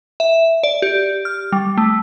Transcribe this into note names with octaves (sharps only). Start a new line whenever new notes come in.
E5
D5
G4
F6
G3
A3